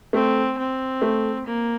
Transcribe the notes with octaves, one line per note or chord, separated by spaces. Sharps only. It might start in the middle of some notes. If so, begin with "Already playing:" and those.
A3 C4
C4
A3
A#3